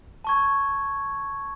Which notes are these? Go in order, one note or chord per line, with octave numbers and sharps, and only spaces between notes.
A5 C#6 G#6